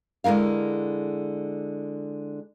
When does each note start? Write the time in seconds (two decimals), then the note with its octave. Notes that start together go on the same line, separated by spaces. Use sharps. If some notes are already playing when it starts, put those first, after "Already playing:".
0.24 D3 G#3 E4 A#4 F5